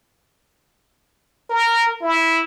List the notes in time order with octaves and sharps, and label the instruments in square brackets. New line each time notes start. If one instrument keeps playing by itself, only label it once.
[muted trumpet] A#4
E4